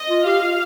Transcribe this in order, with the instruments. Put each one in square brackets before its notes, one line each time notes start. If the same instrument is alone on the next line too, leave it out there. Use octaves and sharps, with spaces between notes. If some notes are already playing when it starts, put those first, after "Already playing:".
Already playing: [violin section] D#5
[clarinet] F4
[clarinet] G4 [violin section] F5
[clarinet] F4